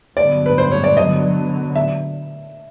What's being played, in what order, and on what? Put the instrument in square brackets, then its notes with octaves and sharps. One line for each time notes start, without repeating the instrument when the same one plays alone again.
[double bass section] G2 D3 F#3 B3 [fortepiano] D5
[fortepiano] B4
C5
C#5
D5
[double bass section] D3 F#3 B3 [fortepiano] D#5
[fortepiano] E5